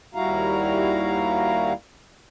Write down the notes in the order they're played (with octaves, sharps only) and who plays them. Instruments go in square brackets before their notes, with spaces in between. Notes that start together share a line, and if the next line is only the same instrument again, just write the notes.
[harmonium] D#2 G3 E4 F#4 F5 A#5